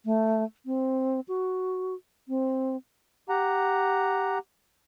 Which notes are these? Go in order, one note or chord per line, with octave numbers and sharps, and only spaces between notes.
A3
C4
F#4
C4
G4 F#5 A#5